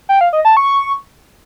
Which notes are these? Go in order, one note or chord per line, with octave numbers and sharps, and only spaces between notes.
G5
F5
D#5
A5
C#6